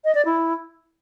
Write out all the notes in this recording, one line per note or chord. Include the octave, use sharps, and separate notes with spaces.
D#5
D5
E4